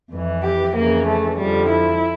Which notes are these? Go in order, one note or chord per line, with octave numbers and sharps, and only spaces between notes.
F2 E3
G4
F2 C#3 E3 A#3
A3
F2 D3 F3 G3
E4